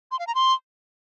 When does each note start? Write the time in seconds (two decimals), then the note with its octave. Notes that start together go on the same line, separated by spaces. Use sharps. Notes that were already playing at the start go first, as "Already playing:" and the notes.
0.11 C6
0.19 F5
0.27 A#5
0.35 C6